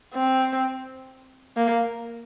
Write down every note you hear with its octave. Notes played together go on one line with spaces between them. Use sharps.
C4
A#3